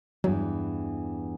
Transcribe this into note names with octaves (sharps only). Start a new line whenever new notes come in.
E2 G2 E3 F#3